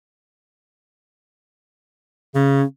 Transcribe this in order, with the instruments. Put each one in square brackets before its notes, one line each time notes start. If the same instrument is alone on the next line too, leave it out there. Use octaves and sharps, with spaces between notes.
[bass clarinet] C#3 [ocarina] C#4